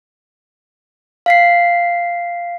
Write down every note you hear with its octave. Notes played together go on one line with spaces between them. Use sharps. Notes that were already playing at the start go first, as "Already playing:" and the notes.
F5 B6 C7